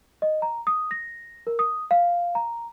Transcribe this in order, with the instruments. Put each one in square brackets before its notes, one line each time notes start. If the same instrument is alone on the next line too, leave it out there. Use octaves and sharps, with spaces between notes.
[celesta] D#5
A#5
D#6
A#6
A#4
D#6
F5
A#5